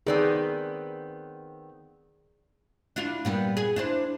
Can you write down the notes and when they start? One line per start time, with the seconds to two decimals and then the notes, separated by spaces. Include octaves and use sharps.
0.07 D#3 B3 C4 G#4 D5
2.96 D4 E4 F4
3.25 A#2 G3 B3
3.57 G#4
3.76 D4 E4 C5